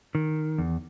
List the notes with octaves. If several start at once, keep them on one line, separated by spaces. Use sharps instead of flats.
D#3
E2